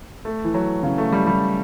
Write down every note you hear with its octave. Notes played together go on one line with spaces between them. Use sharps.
A3
E3
F#3
C#3
A3
G3
G3